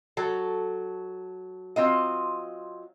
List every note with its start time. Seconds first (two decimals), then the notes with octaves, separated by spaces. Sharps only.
0.17 F#3 A4
1.76 F#3 C4 F4 D#5